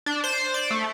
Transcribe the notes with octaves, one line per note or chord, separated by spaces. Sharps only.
D4
C5
D5
A3